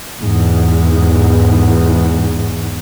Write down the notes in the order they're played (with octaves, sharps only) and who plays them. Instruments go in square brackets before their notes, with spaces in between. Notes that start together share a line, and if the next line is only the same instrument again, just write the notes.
[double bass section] E2 G#2